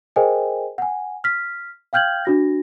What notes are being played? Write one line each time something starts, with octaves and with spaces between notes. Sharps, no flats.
G#4 A#4 C5 D#5 G5 G#5
F#5 G#5
F6 B6
F5 G5 F6 G6 G#6 F#7
D4 F#4 A#6